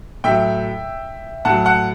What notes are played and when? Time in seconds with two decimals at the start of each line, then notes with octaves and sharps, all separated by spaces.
0.24 A2 F#3 E5 G5
1.45 A2 F#3 F#5 A5
1.65 F#5 A5